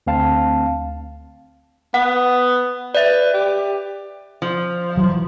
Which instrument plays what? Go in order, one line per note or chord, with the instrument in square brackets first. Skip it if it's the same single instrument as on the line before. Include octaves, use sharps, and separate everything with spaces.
[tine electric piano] D2 C4 F5 A5
[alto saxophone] B3 [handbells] F#5
[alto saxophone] B4 [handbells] D5 E5
[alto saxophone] G4
[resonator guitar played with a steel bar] F3
[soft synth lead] E3 [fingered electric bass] F#3